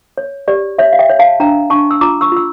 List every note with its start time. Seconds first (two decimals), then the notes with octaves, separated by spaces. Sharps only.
0.18 C#5
0.48 G4 D5
0.78 C#5 E5
0.93 F5
0.99 E5 G5
1.09 C#5
1.19 F5 A5
1.40 D4 G5 A#5
1.70 D4 A5 C#6
1.91 E6
2.01 F4 A#5 D6
2.21 C#6 E6
2.32 F4 E6